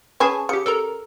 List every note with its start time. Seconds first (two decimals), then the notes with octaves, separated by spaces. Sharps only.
0.20 C#4 G#4 B4 G#5 A5 C#6
0.49 C#3 G4 C#7
0.66 A4 A#4 A#5